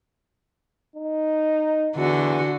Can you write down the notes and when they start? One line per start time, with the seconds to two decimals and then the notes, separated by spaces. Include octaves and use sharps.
0.96 D#4
1.96 E2 D3 F#4